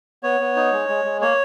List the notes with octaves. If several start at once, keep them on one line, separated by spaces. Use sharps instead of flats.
B3 C#5
B3
D#4
G#3
G#3
G#3
A#3 C#5